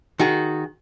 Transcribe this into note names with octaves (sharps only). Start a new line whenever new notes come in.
D#3 F#4 G#4